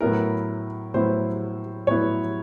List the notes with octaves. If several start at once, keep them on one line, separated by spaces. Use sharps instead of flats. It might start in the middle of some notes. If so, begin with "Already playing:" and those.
A2 F#3 B3 E4 A#4
A2 F#3 B3 E4 C5
A2 F#3 B3 E4 C#5